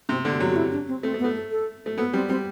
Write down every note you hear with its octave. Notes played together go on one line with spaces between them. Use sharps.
C3 C4
D3
F#3
F#4
E4
D4
C4
A3 C4
A3
B3
A3
A4
A4
A3
B3 A4
G3 C4
G3 C4